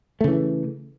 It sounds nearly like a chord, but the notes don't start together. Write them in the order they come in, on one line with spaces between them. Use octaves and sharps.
A3 C#3 E3